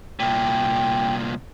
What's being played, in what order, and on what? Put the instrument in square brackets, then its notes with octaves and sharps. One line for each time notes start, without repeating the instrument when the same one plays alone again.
[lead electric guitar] C2 A#2 [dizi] G5